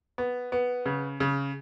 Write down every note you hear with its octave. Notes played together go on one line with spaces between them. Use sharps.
B3
B3
C#3
C#3